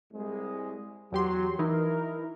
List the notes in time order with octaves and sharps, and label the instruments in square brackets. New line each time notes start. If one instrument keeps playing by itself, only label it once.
[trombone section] C2 G#3
[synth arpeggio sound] E2 G4 C6 [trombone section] F#3
[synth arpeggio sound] E3 D#4 E4 [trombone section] A#4